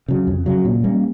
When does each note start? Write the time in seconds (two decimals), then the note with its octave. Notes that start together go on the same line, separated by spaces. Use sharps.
0.08 C#3 F#3
0.27 F2
0.46 C#3 F#3
0.65 A#2
0.84 G3 A#3 C#4